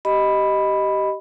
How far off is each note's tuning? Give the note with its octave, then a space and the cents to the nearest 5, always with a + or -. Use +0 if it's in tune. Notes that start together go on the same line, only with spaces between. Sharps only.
G4 -20 D#5 +5 B5 +0